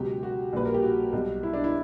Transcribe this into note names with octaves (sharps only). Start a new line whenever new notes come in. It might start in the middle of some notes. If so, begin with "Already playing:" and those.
Already playing: C#2 B2 F#3 G4
F#4
A#1 A#2 G3 B4
A#4
G4
F#4
B1 B2 G3
E4
D4
E4